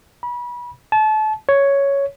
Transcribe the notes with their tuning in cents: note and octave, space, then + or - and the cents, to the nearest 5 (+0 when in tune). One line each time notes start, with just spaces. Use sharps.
B5 -30
A5 -30
C#5 +5